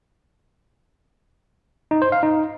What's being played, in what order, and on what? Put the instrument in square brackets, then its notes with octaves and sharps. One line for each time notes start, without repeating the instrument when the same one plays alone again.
[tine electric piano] D#4
C5
F5
D#4